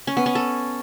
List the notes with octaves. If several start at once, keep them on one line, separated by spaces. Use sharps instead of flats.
C#4
B3
C#4
A4